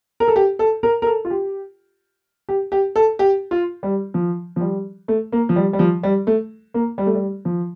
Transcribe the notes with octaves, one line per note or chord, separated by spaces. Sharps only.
A#4
A4
G4
A4
A#4
A#4
A4
F4
G4
G4
G4
A4
G4
F4
G3
F3
F3
G3
A3
A#3
F3
G3
G3
F3
G3
A3
A#3
G3
A3
G3
F3